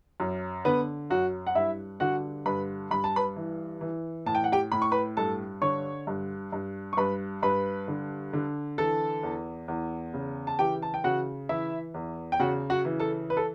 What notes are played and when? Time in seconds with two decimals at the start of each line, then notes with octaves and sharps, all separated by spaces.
0.20 F#2
0.65 D3 B3 B4
1.10 F#2 F#4
1.47 F#5
1.55 G2 E4 E5
2.00 D3 F#4 F#5
2.46 G2 B4 B5
2.91 G2 B5
3.04 A5
3.16 B4 B5
3.36 E3
3.81 E3
4.26 A2 A5
4.35 G5
4.44 F#5
4.52 G4 G5
4.72 A2 B5
4.82 C#6
4.92 B4 B5
5.17 G2 A4 A5
5.62 D3 C#5 C#6
6.07 G2
6.52 G2
6.93 C#6
6.97 G2 B4 B5
7.43 G2 B4 B5
7.88 D3
8.33 D3
8.78 E3 A4 A5
9.23 E2
9.68 E2
10.14 C#3
10.47 A5
10.59 E3 G4 G5
10.82 A5
10.94 G5
11.04 C#3 F#4 F#5
11.49 E3 E4 E5
11.94 E2
12.32 G5
12.40 C#3 F#4 F#5
12.70 F#4 F#5
12.85 E3
13.00 A4 A5
13.30 B4
13.37 A4